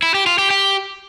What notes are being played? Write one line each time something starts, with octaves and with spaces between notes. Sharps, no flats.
E4
G4
F4
G4
G4